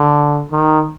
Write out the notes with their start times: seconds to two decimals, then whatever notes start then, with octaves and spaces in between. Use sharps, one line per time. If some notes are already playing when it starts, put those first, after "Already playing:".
Already playing: D3
0.51 D#3